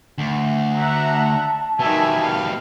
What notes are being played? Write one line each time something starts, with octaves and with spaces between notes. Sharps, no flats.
D2
E5 F#5 A#5
A5
B2 D#3 G3 E5 G#5
F5